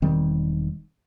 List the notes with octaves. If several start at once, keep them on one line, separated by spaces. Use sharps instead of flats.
E1 D#3 G3 C4